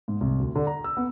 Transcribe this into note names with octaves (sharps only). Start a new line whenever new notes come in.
G#2
C2
D2
D3
A#5
E6
B3